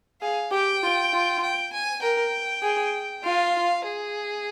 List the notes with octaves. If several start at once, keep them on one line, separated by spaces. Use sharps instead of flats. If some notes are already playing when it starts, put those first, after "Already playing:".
G#4 F5
G4 G5
F4
F4
G5
G#5
A#4 G5
G#4
F4 F5
G#4